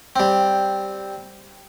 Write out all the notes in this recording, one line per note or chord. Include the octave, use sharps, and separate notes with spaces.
G3 C4